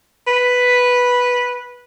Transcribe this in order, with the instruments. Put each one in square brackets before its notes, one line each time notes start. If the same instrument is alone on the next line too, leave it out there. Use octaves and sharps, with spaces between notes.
[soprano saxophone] B4